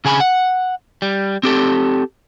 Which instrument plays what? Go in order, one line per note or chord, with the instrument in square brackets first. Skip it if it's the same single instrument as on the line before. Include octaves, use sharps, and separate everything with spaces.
[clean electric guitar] C#3 G#4 G#5 A#5 B5
F#5
G3
C4 G4 A4